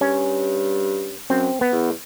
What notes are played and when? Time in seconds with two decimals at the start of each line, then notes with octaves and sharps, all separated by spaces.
0.01 G2 C#4
1.30 F#2 C4
1.61 B3
1.72 E2